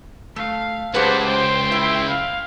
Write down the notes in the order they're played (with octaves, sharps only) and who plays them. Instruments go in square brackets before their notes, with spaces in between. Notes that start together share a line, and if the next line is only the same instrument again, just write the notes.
[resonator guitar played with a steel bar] A3 [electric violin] F5
[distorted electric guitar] C#2 [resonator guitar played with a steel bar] G4 G#4 B4 [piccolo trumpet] C5 [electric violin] F#5 A5
[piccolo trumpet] C5 [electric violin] G5 C6
[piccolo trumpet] E4 [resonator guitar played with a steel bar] E5
[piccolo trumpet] F5